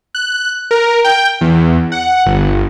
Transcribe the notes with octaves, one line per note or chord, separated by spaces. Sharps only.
F#6
A#4
G5
E2
F#5
G1